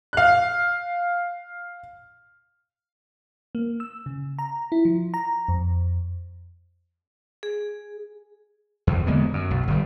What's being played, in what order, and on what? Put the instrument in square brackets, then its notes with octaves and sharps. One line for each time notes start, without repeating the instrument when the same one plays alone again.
[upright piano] F5 F#6
[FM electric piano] A#3
E6
C#3
A#5
E4
F3
A#5
F2
[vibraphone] G#4
[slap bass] E2
D3 G#3 A#3 B3
F#2
B1
G1 G3